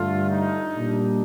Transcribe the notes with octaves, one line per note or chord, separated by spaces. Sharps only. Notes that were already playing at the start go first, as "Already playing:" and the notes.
Already playing: G2 D3 A3 F4
D#4
A#2 G3 D4